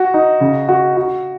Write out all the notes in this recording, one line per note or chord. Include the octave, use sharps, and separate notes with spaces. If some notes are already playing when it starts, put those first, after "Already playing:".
Already playing: F#4
D#4
C#3
F#4
F#4